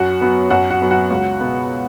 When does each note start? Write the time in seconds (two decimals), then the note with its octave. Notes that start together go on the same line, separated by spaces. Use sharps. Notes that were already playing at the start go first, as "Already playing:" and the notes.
Already playing: F#2 F#4 F#5
0.21 F#3 B3
0.50 F#2 F#4 F#5
0.70 F#4 F#5
0.81 F#3 B3
0.91 F#4 F#5
1.11 C#2
1.40 B2 B3